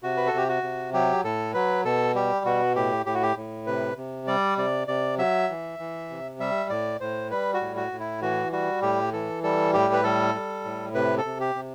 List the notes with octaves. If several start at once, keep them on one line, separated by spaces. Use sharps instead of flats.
C3 F#4
B4
A4
C3 G4
F#4
C3
F#3 G4
A2 A4
F#3 B4
B2 A4
G3 G4
B2 F#4
A2 G4
A2 G4
F#4
G4
A2
C3 B4
C3
G3 D5
C3 D5
C3 D5
F#3 E5
E3
E3
C3
G3 E5
A2 D5
A2 C5
G3 B4
F#4
A2
F#4
A2
E4
E3 F#4
G3 F#4
A2 G4
E3 A4
G3 A4
A2 G4
B4
G3 A4
G3
A2
C3 B4
A4
C3
G4
C3